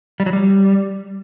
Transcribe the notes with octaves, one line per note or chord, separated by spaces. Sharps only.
G3
F#3
G3